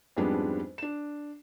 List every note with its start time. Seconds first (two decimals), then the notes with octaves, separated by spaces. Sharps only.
0.17 F2 G#2 G3 G#3 B3 D4
0.78 D4 E7